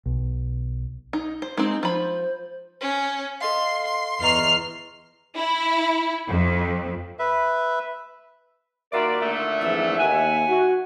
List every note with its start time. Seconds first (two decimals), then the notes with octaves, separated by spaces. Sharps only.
0.06 B1
1.13 D#4
1.42 C5
1.57 G#3 C4 D#4
1.83 F3 C5 B5
2.81 C#4
3.41 A4 D#5 F5 C6
3.85 C6
4.22 E2 D#5 A#5 C#6 F6 C7
5.39 E4
6.31 F2
7.19 B4 E5
8.92 D#2 F4 F#4 A#4 D5 E5
9.21 A#2 D3 A3
9.61 F2 G#2 E3 E5
9.98 D#2 F#5 G#5
10.49 F#4